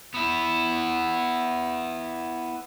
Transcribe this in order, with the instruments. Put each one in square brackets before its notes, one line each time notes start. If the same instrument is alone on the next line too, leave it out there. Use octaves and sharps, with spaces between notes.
[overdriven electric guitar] B3 E4